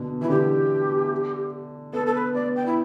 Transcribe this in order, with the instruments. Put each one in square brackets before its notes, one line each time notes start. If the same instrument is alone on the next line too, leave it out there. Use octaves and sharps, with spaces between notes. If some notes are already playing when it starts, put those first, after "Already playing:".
Already playing: [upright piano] B2 D3
[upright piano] E3 [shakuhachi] E4
[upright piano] D3 [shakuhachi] G4
[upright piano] B3 [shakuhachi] A4
[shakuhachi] A4
B4
[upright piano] B3 [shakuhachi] D5
[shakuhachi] G5
E4